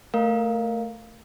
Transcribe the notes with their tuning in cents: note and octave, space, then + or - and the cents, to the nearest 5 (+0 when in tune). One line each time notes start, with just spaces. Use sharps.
A3 +15 A#4 +0 F5 +0